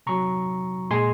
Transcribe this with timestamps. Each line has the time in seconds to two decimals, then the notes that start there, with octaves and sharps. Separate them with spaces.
0.07 C3 F#3 A#5 C#6
0.90 A#2 G#3 G#5 C6